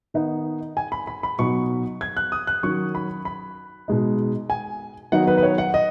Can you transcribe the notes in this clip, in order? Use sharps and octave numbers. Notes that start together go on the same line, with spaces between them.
D#3 B3 D#4
G#5
B5
B5
B5
B2 F#3 B3 D#4 C#6
G#6
F#6
D#6
F#6
D#3 F#3 C#4 C#6
B5
B5
B2 G#3 D#4
G#5
D#3 F#3 B3 D#4 F#5
B4
B4
C#5
F#5
D#5